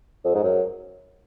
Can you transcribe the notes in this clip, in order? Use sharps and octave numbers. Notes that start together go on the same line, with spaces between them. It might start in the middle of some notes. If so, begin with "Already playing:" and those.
F2
G#2
F#2